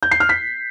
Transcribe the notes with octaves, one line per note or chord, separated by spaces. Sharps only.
G6
C7
F6
B6